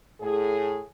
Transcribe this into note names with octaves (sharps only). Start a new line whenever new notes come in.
A2 G#4